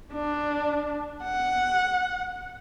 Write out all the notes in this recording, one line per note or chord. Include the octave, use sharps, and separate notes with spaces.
D4
F#5